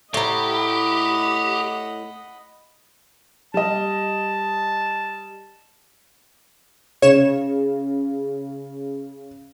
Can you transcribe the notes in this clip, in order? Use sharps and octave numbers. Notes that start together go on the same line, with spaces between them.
A2 G4 D#5 F#5 A#5 B5
G3 D#5 A5
C#3 C#5 E7